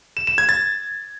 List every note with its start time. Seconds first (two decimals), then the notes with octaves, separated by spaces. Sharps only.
0.17 E7
0.27 E7
0.38 G#6
0.49 A6